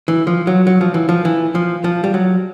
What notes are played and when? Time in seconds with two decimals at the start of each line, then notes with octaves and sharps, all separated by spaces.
0.08 E3
0.27 F3
0.47 F#3
0.67 F#3
0.81 F3
0.94 E3
1.09 F3
1.25 E3
1.55 F3
1.84 F3
2.04 G3
2.14 F#3